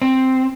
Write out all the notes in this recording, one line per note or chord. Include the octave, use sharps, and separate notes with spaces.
C4